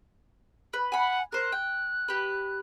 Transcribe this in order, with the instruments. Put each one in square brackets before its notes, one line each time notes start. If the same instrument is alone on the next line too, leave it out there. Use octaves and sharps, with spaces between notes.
[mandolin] B4
[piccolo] F#5 [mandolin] G#5 B5
[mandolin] A#4 C5 [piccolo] F#6
[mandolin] G5
G4 B4